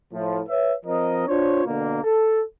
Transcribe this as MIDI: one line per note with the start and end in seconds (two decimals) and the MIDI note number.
0.12 0.40 45
0.12 0.40 53
0.48 0.73 71
0.48 0.73 73
0.48 0.73 76
0.85 1.25 53
0.85 1.25 60
0.85 1.25 70
0.85 1.25 75
1.27 1.60 62
1.27 1.60 65
1.27 1.60 72
1.27 1.60 73
1.65 2.03 47
1.65 2.03 50
1.65 2.03 58
2.03 2.42 69